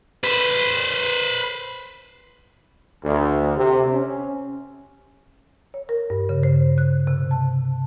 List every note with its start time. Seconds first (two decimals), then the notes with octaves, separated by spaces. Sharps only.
0.24 B4 C5
3.04 D2
3.55 C3
3.93 C#4
5.74 C#5
5.89 A#4
6.10 G2
6.29 C#3
6.43 C5
6.78 F#6
7.07 C3
7.31 A5